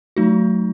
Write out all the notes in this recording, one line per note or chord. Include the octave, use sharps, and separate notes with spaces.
F#3 A3 D#4 F#4